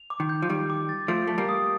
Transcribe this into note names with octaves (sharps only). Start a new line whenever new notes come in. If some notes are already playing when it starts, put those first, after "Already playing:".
Already playing: F7
D6
D#3
G6
F3
D#3 G3 D6
D6
A6
F3 A3 D7
A3 A5
G3 A#3
D#6